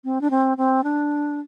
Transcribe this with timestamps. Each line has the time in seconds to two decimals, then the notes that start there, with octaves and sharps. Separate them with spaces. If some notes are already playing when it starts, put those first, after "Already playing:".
0.04 C4
0.21 D4
0.30 C4
0.57 C4
0.84 D4